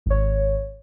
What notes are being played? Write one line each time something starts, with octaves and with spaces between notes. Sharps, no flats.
G#1 C#5